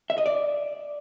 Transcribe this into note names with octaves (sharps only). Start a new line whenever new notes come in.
E5
D#5
D5